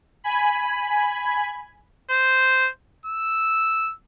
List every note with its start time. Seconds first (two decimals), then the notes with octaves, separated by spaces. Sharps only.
0.24 G#5 B5
2.11 C5
3.06 E6